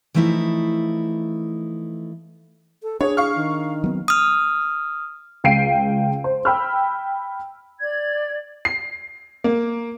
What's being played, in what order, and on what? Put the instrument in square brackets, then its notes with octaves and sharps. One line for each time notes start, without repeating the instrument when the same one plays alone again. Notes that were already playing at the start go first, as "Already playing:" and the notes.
[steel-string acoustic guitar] E3 F3 A3 D#4 E4
[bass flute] A4
[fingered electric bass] D4 [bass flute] G#4 [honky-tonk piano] C#5
[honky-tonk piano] F5 C#6 F6
[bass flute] D#3
[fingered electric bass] F#3 B3 C4
[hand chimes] D#6 F6
[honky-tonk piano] C#2 F5 G5 C7 D7 D#7
C5
G5 B5 E6 F6
[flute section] D5 G#6
[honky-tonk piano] C7
A#3